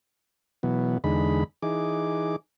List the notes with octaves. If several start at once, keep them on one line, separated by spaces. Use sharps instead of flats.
B2 E3 F#3 B3
E2 D3 G#3 D#4 B5
E3 D#4 G#4 D6